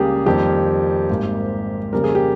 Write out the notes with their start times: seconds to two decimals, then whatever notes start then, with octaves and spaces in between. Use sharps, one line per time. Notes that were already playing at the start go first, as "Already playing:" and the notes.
Already playing: C#2 C#3 G3 A#3 G4 G#4
0.26 F2 D#3 G3 A#3 G4
1.09 G#1 G#2 G3 A#3
1.92 F2 C#3 G3 A#3 A#4
2.04 G#4
2.15 G4